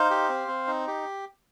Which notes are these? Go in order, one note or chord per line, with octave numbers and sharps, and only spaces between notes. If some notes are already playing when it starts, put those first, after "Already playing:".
Already playing: D#4 C5 F5
G4
C4
C4
D#4
G4